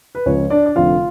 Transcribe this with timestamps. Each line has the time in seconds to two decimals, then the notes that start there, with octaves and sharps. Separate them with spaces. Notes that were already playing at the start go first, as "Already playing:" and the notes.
0.15 B4
0.26 C#2 C#3 F3 C#5
0.50 D4 D5
0.66 D5
0.76 F1 F2 D3 F3 F4 F5